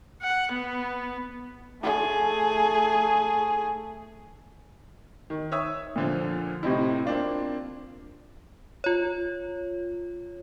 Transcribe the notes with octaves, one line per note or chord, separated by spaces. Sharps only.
F#5
B3
A3 G#4
D#3
C#5 E5 D#6 E6
A#2 D3 F3
A2 C3 C4 D#4 E4
A#3 C4 D4 F4
F4 C#5